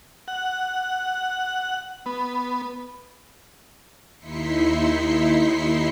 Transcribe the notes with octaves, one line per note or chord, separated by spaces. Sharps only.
F#5
B3
D#2 D#4 E4 C6 B6 C#7